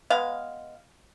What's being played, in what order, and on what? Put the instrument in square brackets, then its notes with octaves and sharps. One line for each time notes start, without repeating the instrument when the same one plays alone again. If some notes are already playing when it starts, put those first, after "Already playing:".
[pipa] G#3 B3 F5